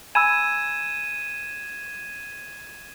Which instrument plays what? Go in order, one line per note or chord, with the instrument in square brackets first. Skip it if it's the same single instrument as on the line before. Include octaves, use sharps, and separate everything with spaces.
[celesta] G#5 B5 E6 [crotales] G#6 D#7 E7